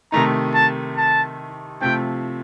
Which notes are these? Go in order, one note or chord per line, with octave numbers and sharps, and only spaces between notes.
C3 D#3 A3 D#4 A#5
A5
A5
C3 F3 A3 C4 G5